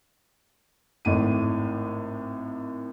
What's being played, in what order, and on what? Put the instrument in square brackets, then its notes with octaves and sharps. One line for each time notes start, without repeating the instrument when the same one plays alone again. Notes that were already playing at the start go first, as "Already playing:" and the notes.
[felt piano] G#1 A2 D#7